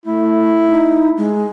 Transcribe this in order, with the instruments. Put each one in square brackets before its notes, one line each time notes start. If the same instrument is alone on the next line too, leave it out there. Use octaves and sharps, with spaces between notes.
[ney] A3 [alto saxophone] E4
[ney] D#4
G#3